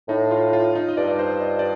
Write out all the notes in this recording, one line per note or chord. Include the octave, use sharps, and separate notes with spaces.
A2 D#4
F4
F4
D#4
D#5
G2 D5
D5
C5
D#5
D5